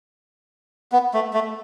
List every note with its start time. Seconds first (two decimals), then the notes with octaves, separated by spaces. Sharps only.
0.92 B3
1.14 A3
1.34 A3